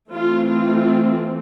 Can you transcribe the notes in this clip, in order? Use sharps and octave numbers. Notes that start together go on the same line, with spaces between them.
E3 A3 C4 F4
F4